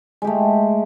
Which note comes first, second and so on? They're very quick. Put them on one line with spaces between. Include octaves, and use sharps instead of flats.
G#3 G4 A3